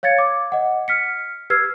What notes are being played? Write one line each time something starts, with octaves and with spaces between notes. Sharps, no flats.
C#5 F5 G#6 A6 C#7
D6
D#5 F#5
F6 B6 C#7
G4 B4 E6 F6 G#6 C7